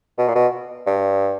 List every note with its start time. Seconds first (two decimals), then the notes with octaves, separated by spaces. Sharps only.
0.18 B2
0.28 A#2
0.35 B2
0.87 G2